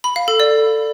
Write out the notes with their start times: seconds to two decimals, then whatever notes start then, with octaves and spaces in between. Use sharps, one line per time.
0.04 B5
0.16 F5
0.28 A4
0.40 D5